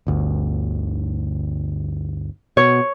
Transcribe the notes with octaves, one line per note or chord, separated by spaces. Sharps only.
G1 D2
B2 C#5